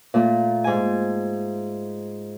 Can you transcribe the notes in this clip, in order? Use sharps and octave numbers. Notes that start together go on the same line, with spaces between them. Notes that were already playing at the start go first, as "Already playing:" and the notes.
A#2 A3
G#2 G#5